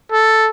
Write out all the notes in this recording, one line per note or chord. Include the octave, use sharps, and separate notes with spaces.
A4